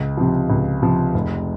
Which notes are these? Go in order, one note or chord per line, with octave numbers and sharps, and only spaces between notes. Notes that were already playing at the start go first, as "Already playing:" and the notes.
Already playing: C#2
C3 F3
C#2
C3 F3
F1